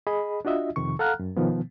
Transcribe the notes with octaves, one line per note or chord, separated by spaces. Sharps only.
G#4 D#5 B5
D4 F4 F#4 D#5 E5
F2 C3 D#3 C#6
A4 F5 F#5 A#5 F6 F#6
F#2
B2 D#3 F3 B3